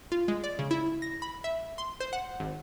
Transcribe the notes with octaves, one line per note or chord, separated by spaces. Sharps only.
F4
G#3
D5
C#3
E4
A#6
B5
E5
C6
C5
F#5
G#1